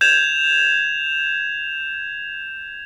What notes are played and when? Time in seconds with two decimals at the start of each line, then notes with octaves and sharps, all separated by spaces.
0.01 G6 G#6 E7 F7